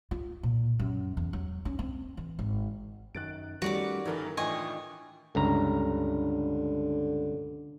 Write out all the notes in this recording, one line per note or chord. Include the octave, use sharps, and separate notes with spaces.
F4
A#2
F#2
E2
F#3
C#4
C4
E3
G#1
F#2 D#3 F#6 A6 D7
D#3 G3 A3 C#4 F#4 D5 D6
G1 E3 D#4 E4 A4 A#4
A2 E3 D4 F4 D#5 G5 G#5 C#6
C#2 G2 D3 A#5